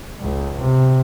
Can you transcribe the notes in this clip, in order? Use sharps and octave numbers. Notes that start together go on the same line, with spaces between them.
C#2
C3